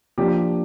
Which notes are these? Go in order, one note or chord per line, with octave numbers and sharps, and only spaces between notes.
F3 A#3 D4 G4